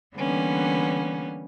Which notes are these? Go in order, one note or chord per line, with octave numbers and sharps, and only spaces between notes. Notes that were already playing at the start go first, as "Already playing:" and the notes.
D3 E3 G3 A#3 B3 C#4